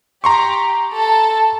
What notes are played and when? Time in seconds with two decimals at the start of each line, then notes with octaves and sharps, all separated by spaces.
0.24 G4 A#5 C6 C#6
0.93 A4 A5